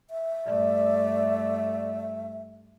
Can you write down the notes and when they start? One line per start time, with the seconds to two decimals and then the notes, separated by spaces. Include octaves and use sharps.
0.10 E5
0.45 G2 A3 D5